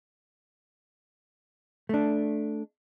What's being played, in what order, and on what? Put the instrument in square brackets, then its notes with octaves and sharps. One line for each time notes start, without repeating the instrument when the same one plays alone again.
[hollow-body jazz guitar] A3 D4